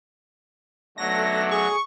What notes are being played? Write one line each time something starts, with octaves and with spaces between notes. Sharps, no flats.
B1 D3 F#3 A3 A#6
G#4 C#6